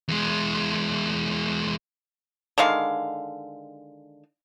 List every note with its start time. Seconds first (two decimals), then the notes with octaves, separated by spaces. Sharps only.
0.08 E2 G#3
2.58 D3 D#3 G#3 F5